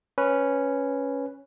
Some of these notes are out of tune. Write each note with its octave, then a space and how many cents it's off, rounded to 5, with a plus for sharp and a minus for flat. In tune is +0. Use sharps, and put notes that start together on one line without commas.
C#4 +0 B4 +0